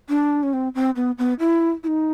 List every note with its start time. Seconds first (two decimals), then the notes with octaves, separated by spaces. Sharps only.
0.09 D4
0.43 C#4
0.53 C4
0.75 C4
0.96 B3
1.18 B3
1.39 E4
1.83 E4
1.87 D#4